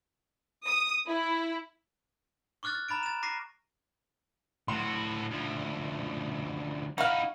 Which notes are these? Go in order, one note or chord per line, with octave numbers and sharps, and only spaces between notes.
D#6
E4
C#6 D6 F6 F#6 A6
A6
A#5 B5 A6 D7
A6 E7
D6 A#6 C7 D#7
A2 F#4 C6
D2 F3
D#4 E4 F#4 F5